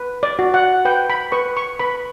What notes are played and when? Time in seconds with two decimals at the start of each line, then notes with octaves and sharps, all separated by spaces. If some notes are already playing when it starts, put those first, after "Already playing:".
Already playing: B4
0.23 D5
0.39 F#4
0.54 F#5
0.85 B4 G5
1.10 B5
1.32 B4 C#6
1.57 C#6
1.79 B4 B5